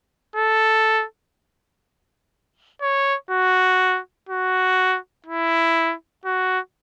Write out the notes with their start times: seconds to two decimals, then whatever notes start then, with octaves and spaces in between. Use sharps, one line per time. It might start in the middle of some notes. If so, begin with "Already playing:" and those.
0.36 A4
2.82 C#5
3.31 F#4
4.29 F#4
5.27 E4
6.25 F#4